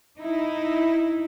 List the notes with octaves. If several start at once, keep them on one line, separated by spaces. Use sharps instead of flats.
D#4 E4